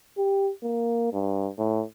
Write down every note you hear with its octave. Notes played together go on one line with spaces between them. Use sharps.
G4
A#3
G2
A2